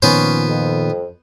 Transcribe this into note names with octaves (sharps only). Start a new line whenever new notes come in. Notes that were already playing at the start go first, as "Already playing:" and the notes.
A#2 D#3 F3 B3 C#4 C5
F2